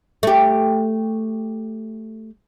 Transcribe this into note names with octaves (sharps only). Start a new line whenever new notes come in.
A3 G4